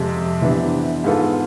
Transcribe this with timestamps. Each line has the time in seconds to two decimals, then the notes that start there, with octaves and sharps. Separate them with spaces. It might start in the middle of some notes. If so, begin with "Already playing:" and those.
Already playing: F2 C3 G#3
0.41 C3 E3 B3 D4
1.04 G#2 G#3 B3 F4 A4